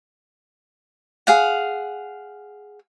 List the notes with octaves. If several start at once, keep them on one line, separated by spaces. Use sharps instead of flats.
G#4 F5 F#5